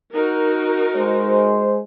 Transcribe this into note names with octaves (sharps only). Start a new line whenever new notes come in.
D#4 F#4 A#4
G#3 C5